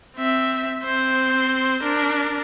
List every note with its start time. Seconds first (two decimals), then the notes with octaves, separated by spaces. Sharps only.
0.17 C4 E5
0.83 C4 C5
1.83 D4 A#4